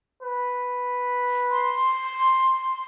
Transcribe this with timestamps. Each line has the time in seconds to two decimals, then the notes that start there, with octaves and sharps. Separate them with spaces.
0.23 B4
1.51 C6